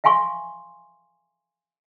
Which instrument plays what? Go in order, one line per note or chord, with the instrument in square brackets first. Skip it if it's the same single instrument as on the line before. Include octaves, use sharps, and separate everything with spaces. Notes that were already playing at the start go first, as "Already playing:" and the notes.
[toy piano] E5 F5 G#5 C6 C#6